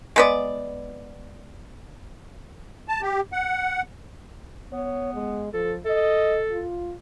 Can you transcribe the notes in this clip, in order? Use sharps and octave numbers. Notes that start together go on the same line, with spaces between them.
G#3 B3 D5
A5
G4
F#5
B3 C#5
G#3
F3 A4
A4 D#5
F4